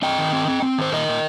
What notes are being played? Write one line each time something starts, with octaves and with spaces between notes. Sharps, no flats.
C4 D#5 G5
D#3
C4
C4
C4
D#3 C5
A#2 A#4 D#5
A#2